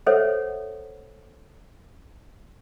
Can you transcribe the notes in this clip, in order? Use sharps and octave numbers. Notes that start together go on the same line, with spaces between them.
A4 C5 C#5 E5 F#5